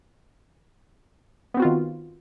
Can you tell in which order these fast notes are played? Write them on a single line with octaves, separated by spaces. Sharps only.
B3 C4 F#4 F4 D#3